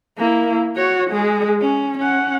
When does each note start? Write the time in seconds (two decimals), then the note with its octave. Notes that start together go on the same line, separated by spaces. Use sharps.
0.18 A#3 E4
0.77 F#4 C#5
1.10 G#3 G#4
1.61 C#4
1.98 C#4 F#5